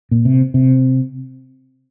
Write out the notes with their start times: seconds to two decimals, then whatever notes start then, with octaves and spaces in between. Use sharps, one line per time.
0.11 A#2
0.25 C3
0.54 C3